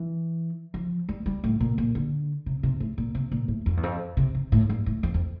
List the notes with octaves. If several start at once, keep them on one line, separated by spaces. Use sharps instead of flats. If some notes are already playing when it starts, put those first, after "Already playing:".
Already playing: E3
F3
G3
G3
A2
A#2
A#2
D3
C3
C3
A2
A#2
C3
A#2
A2
F2
E2
F2
C3
C3
A2
G2
A2
F2
F2